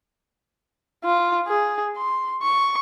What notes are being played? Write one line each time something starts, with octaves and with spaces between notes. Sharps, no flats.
F4
G#4
C6
C#6